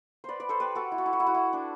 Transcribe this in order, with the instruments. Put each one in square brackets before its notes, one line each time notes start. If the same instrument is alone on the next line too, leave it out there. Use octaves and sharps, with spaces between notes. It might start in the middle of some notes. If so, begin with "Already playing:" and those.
[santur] B4 C5 D5
B4 D5
A4 C5
G4 B4
F#4 A4
E4
F#4
E4
F#4
E4
F#4
E4
D4